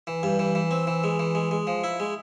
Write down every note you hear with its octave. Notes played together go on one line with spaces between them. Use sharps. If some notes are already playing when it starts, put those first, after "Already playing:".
E3
G2
E3
E3
C4
E3
G#3
E3
G#3
G#3
F3
E4
G#3